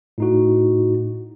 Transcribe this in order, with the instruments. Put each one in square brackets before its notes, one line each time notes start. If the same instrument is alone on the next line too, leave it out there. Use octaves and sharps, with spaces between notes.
[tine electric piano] A2 D#4 F#4